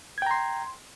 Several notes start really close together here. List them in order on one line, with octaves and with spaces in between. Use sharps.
G#6 G5 A#5 C6